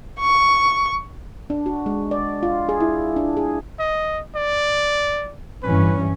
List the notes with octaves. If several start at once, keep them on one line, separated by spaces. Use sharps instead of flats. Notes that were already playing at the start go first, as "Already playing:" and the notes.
C#6
D4
F#4
G#3
D5
F4
G#4
E4
D4
G#4
D#5
D5
G2 E3 C#4 B4